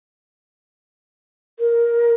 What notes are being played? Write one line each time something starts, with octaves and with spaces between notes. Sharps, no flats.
A#4